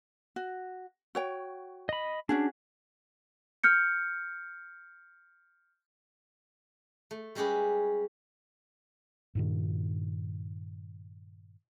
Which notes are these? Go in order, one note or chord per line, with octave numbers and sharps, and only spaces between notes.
F#4
F#4 C#5 G5
D#5 B5
C#4 D4 F#4 G#4
F6 G6 C#7
A3
G3 G#3 C#4 G4 G#4 B4
G2 A#2 D#3